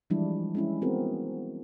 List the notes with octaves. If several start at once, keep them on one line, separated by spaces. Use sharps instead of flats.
E3 F3 G3 G#3 D4 E4
G#3 C#4 E4
B3 C4 F#4 G#4 A#4